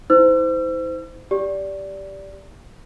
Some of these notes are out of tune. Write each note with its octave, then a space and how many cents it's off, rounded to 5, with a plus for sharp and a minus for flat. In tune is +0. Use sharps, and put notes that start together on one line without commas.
E4 -40 C5 -25 E6 +40
G4 +0 D5 -15